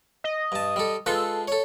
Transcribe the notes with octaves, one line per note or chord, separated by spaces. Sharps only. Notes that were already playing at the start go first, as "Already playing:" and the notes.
D#5
G2 A5
G3 A4
G#3 F4 A4 B4
A4 C#5